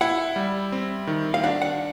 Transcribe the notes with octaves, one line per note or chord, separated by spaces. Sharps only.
E4 F#5
G3
C4
D#3
F5
D4 F#5
F#5